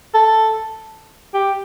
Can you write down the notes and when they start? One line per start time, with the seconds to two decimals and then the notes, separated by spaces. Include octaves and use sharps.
0.14 A4
1.34 G4